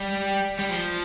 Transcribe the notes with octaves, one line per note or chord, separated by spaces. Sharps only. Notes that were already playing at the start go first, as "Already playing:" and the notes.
Already playing: G3
G3
F3